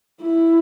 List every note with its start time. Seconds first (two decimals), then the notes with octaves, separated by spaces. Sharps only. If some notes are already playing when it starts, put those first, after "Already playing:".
0.22 E4